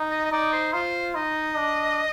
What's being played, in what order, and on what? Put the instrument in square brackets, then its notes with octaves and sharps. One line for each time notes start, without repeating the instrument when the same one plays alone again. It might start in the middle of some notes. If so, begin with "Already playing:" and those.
Already playing: [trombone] D#4
[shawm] D#5
D#5
[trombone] D#4 [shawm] D5
[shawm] C5
[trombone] F4 [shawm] C5
[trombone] D#4 [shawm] D#5
[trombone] D4